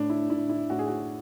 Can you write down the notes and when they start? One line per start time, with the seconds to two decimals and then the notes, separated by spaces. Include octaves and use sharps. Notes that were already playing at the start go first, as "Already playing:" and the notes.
Already playing: A2 D4
0.10 E4
0.30 A2 E4
0.49 E4
0.70 A2 F#4
0.79 G#4
0.87 F#4